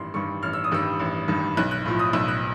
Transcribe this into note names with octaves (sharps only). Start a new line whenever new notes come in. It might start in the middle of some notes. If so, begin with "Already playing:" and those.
Already playing: A1 G2 D#3 G3 C6
G2 D#3 G3 C#6
A1 F6
E6
D#6
G2 D#3 G3 E6
A1
G2 D#3 G3
B1 F#6
F#6
A2 F3
D#6
B1 E6
F#6